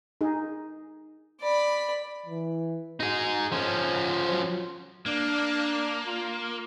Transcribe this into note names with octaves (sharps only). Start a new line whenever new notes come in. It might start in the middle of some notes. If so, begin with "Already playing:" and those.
D#4 G#4
D5 B5
E3
D#4 F#4 G#4
F3 C#4 C5
F#3
A#3 D4
F4